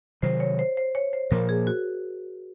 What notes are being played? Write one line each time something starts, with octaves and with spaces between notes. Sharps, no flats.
C3 D#3 F#3 C5
C#5
C5
C5
C#5
C5
A#2 F3 A#3 A#4
G#4
F#4